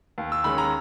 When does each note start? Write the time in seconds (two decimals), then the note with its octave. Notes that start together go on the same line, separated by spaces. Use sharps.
0.18 D#2
0.32 E6
0.44 D#3 G#3 C#4 B5
0.58 A#5